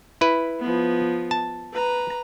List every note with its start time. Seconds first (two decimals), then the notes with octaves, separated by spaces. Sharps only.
0.21 E4 B4
0.60 F3 B3
1.31 A5
1.73 B4 A#5